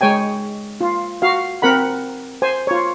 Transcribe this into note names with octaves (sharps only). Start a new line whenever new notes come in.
G#3 C#5 G5 G#5
F4
F#4 F5
C4 A#4 F#5 B5
C5 G#5
F4 C#5